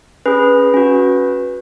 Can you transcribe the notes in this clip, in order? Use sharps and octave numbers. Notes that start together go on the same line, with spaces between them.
C#4 G#4 B4
C#4 F#4